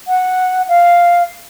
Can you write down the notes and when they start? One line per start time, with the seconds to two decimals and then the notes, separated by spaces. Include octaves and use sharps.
0.08 F#5
0.69 F5